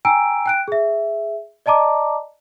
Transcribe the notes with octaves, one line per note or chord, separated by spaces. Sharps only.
G5 G#5 A#5 E6 D7
G5 F#6 D7
G#4 E5
D5 D#5 A5 A#5 D6